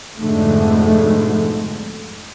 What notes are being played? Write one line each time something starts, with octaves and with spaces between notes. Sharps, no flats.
F2 G#2 B2 D3 G#3 A3